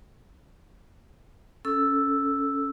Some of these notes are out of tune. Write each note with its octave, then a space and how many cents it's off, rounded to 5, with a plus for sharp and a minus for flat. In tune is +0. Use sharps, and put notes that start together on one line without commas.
C#4 +5 A4 +0 E6 +0